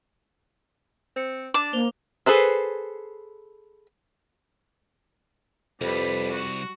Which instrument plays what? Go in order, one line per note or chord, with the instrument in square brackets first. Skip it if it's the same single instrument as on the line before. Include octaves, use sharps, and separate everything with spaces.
[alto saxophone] C4 [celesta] C5 C#7
[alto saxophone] D4 [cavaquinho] D6 [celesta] A6 E7
[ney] A#3 [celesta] C5 F7 G7
[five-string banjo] G#4 A4 B4 C5
[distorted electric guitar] C2 [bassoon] F2 [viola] G3 B4
[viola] F#4